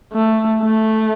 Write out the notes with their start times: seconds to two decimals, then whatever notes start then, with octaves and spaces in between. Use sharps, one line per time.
0.13 A3
0.63 A3